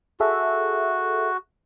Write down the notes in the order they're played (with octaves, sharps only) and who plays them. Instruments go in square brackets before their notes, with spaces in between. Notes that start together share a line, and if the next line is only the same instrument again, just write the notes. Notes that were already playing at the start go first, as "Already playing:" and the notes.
[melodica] F#4 [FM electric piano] G#4 A4 E5